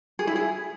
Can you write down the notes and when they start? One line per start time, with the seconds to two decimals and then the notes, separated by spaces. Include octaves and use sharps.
0.19 G#4
0.27 E4
0.36 G#4